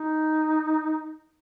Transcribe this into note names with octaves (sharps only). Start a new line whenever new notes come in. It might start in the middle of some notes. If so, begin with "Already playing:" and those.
Already playing: D#4